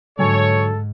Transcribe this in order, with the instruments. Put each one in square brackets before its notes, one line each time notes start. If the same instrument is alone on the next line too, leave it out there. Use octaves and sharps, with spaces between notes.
[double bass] G#2 [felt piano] D3 F#3 G#5 [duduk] A4 [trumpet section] C#5